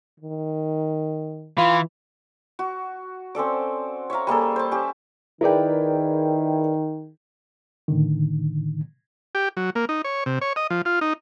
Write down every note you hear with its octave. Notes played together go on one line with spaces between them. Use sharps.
D#3
E3 F4
F#4
C4 C#4 A4 D5
C#5 E5 F5 A#5
G3 A#3 G#4 A4
C5 A5
C#4 G4
D#3 E4 G#4 A#4 B4 D5 G5
A2 D3 D#3
G4
F#3
A#3
D#4
C#5
C3
C#5
D#5
F3
F4
D#4